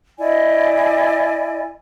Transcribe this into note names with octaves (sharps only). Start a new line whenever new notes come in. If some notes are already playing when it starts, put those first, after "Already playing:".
E4 D5 D#5 G#5